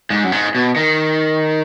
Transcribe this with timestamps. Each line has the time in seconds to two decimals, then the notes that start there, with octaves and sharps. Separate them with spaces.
0.10 G#2
0.24 F#2
0.32 G#2
0.55 B2
0.76 D#3